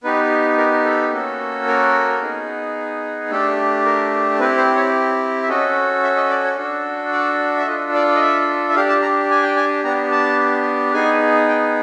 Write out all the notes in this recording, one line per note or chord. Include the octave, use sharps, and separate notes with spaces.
B3 D#4 G4 B4
A#4
A4
A#3 C#4 F#4 A4
A#4
B3 D#4 G#4
A3 D4 G4 A4
A#4
C4 E4 G4 B4
C5
C#5
E5
C#4 F#4 A4 D#5
E5
D#5
D5
C#5
D4 F#4 A4
D5
E5
D4 F4 A4 D#5
D5
D#5
E5
E5
D4 G4 F5
A5
A#5
G#5
G5
G#5
B3 D4 G4 A#5
A5
B3 D#4 G#4 G#5
G5